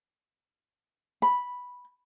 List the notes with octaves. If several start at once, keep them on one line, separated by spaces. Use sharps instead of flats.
B5